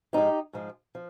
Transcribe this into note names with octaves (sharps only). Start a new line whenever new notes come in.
G#2 F3 G#3 D#4 G4
G#2 F3 G#3
F3